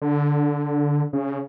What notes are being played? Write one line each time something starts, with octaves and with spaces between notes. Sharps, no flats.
D3
C#3